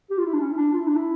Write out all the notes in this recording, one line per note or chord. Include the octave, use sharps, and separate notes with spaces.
G4
F4
E4
D4
C#4
E4
D4
F4
E4
D4
E4